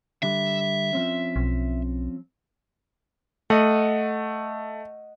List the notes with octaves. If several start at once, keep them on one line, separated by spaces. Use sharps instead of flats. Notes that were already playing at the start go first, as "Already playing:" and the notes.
D3 G3 E5
F3 C4 C#4
B1
A3 D#5 F#5